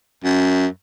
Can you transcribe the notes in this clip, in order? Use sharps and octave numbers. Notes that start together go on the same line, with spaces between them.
F#2